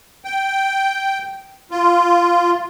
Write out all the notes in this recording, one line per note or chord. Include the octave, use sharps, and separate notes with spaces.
G5
F4